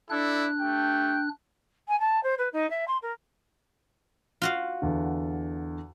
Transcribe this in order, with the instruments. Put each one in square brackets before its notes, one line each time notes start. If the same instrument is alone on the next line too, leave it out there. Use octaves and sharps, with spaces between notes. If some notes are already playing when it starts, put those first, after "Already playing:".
[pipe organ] D4 F#6 [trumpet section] E4 A4 D5
[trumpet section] A3 G4 G5
[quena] G#5
A5
C5
B4
D#4
E5
C6
A#4
[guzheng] F4 F#4 F5
[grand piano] E2 D3